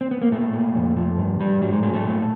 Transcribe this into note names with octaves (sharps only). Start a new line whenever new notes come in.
C4
B3
A#3
A#2 A3
A#2
F2
F3
G2
G2 G3
G#2 F#3
G#3
F#3 G#3
A3
A#2